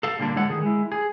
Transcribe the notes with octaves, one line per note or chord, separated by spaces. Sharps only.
A4 F5
A#2 D3 G3 A#3 D4
A2 D3 G#3 A4 C#5 F#5
D#3 G#4
G#3 E4
G#4